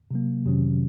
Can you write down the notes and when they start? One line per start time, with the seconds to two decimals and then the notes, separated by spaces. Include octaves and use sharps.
0.11 C3 F#3 A#3
0.46 F2 C3 D#3 F#3 C#4